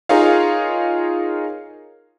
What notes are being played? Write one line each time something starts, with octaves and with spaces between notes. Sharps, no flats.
D#4 F4 G#4 A#4 C#5 F5